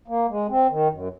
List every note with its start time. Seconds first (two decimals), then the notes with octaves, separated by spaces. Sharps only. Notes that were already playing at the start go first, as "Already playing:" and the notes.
0.08 A#3
0.28 G#3
0.49 C4
0.70 D#3
0.90 F#2